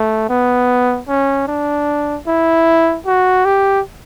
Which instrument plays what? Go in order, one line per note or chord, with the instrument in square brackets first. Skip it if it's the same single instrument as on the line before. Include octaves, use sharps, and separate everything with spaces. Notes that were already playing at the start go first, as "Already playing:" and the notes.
Already playing: [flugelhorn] A3
B3
C#4
D4
E4
F#4
G4